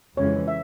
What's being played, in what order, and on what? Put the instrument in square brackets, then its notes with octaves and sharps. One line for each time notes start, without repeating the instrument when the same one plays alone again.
[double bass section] F2 C#3 E3 G#3 C#4 [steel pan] C#5
[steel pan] E5